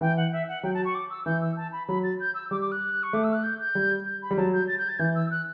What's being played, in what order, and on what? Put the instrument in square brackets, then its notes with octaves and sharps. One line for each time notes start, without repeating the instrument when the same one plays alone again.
[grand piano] E3 [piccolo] G5
[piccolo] F#5
E5
F#5
[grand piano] F#3 [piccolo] G5
[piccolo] A5
C#6
D6
E6
[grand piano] E3 [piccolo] G6
[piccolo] E6
A5
B5
[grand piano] F#3 [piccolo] B5
[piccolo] A6
G6
E6
[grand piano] G3 [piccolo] D6
[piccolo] D6
F#6
C#6
[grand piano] A3 [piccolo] D6
[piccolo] E6
F#6
G6
G6
[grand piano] G3
[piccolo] G6
B5
[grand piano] G3
[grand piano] F#3 [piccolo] A5
[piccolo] G6
A6
G6
A6
[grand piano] E3 [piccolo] G6
[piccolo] E6
F#6